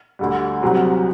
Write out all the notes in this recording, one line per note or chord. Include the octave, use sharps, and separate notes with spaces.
D2 D3 G3
C2 C3 F#3 C4